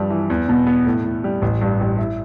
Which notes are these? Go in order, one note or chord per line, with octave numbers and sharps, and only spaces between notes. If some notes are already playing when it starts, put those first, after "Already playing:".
Already playing: G2 F3 G3
E3
E2
B2
B3
A2
A2
G3
A1
G2
A1
E4